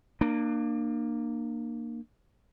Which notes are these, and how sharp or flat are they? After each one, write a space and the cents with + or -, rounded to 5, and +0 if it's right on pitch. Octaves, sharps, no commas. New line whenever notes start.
A#3 +0 D4 +35